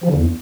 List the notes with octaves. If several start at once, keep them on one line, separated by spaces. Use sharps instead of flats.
F3
D3
E2